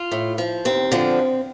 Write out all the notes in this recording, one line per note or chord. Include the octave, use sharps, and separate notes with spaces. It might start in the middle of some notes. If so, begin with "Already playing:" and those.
Already playing: F4
A2
F3
D#2 C4
D3 F3